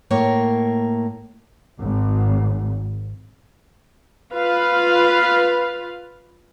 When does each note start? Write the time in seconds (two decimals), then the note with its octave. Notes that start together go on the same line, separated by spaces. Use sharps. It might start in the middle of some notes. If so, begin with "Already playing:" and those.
0.10 A2 A#3 A#4 C#5
1.80 G#1
4.35 F4 B4 F5